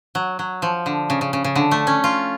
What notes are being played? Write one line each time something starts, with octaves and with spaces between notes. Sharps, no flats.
F#3
F#3
F3
D3
C#3
C#3
C#3
C#3
D3
A3
C#4
F4